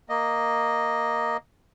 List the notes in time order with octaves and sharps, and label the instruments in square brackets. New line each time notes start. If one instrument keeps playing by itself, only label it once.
[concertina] A#3 D#5